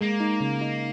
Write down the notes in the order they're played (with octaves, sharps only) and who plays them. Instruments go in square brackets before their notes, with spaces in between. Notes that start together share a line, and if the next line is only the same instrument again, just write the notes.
[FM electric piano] G#3 [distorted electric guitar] A#3
[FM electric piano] D#4
C#3
D#4